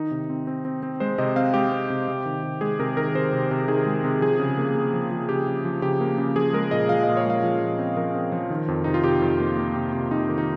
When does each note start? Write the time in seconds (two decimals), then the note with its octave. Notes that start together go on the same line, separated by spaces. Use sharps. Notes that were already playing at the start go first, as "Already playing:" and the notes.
Already playing: D#3 D#4
0.11 C3
0.30 C4
0.47 C4
0.65 C4
0.83 C4
1.00 G#3 C5
1.18 C3 D#5
1.36 C4 F5
1.54 G#3 G4
1.72 C4
1.90 C3
2.08 C3
2.26 D#3
2.43 C3
2.61 G#3 G#4
2.79 C3 A#4
2.97 D#3 A#4
3.15 C3 C5
3.33 C3
3.51 C3
3.68 D#3 G#4
3.87 G#3
4.04 C3
4.21 F3 G#4
4.40 C#3
4.58 A#3
4.75 A#3
4.93 F3
5.11 F3
5.29 C#3 G4
5.47 C#3
5.65 F3
5.82 C#3 G4
6.00 A#3
6.18 C#3
6.36 F3 G#4
6.53 G#3 A#4
6.71 A#2 D#5
6.89 F3 F5
7.03 A#2 D#5
7.17 C#5
7.25 G#3 F5
7.43 F3
7.61 A#2
7.79 C4
7.97 F3 A#4
8.15 C4
8.32 F3
8.50 D#3
8.68 F2
8.84 C3 D#4
8.94 F4
9.04 C3 G4
9.22 F2
9.39 A#3
9.57 A#3
9.76 C3
9.93 C3
10.11 F2 D#4
10.29 D#3
10.38 D#4